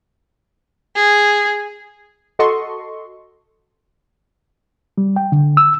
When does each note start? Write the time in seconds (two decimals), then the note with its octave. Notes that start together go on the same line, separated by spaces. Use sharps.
0.96 G#4
2.39 F#4 A4 D#5 C6 C#6
4.98 G3
5.16 G5
5.32 D3
5.57 E6